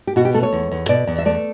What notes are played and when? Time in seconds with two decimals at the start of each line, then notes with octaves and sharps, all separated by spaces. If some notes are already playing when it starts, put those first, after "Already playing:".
0.07 G4
0.16 B2 F#4
0.25 G4
0.34 A3 A4
0.43 C#5
0.52 E2
0.71 E2
0.89 B2 D5
1.07 E2
1.18 E5
1.25 A3 D5